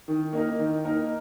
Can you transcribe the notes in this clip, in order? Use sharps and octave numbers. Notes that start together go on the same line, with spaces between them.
D#3
A#3 D#4 A#4
D#3
A#3 D#4 A#4